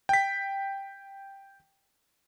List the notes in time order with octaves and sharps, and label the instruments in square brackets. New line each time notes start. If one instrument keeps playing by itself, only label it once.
[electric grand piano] G5 B6